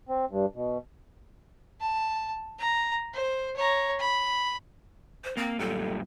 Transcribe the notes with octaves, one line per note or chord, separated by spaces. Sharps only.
C4
G2
B2
A5
A#5
C5
C#5 A#5
B5
C5
A#3 C4
F#2 A#2 G3 A4